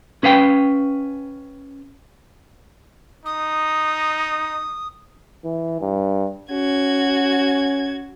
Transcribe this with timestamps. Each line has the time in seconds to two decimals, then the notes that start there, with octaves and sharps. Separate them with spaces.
0.23 C#4 B4 F5 G5
3.26 D#4 D#6
5.44 E3
5.81 G2
6.51 C#4 F#4 G#6